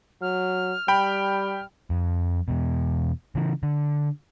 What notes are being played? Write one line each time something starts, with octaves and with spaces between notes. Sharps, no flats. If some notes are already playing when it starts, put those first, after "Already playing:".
F#3 F6
G3 G5 B5
F2
E2 B2
C#3 E3
D3